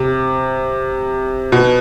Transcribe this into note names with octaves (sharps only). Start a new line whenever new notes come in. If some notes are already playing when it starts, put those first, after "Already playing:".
Already playing: C3
B2